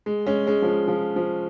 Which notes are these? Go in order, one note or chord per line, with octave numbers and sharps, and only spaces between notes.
G#3
G#3 C#4
G#3 C#4
F3
G#3
F3
F3